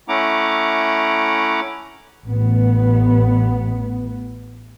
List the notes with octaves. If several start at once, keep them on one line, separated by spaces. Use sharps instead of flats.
A3 C#4 E4 F#5 A#5 D6
A1 B3